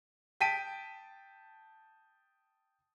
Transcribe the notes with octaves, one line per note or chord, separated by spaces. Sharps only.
G5 A5 B6 D7 D#7